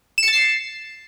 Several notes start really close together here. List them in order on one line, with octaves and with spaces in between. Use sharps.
E7 C#7 A6 C7